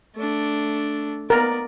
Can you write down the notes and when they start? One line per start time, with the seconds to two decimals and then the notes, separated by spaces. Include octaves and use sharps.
0.15 A3 D4
1.30 B3 A#4 D5